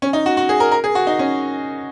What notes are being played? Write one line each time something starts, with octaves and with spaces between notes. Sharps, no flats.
C#4
D#4
F#4
F#4
G#4
A#4
A#4
G#4
F#4
D#4
C#4